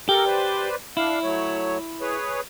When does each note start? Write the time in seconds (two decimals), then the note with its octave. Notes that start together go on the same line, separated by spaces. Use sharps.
0.09 G4 A4 A#4
0.25 B4 C5 D5
0.97 D4 E4 F5
1.23 F#3 A3 C#5
2.01 G#4 B4 C#5